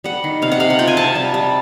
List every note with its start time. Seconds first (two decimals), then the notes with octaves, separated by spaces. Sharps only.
0.04 G3 F#5
0.24 D#3
0.42 C3 F5
0.52 F#5
0.60 C3 F5
0.70 F#5
0.79 F4 G5
0.87 G#5
0.97 C4 A5
1.15 G3
1.34 G3